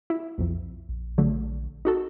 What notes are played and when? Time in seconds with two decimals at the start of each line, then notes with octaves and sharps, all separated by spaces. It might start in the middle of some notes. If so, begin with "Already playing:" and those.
0.10 E4
0.38 B1 F2
0.89 A#1
1.18 D3 F#3 A3
1.85 D#4 F#4 A4